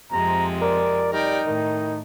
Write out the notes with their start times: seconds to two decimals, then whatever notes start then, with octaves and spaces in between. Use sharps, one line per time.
0.12 F2 C3 G#3 A#5
0.62 A#4 D5
1.13 G3 D#4 A#4 D5 G5
1.46 A2 D#3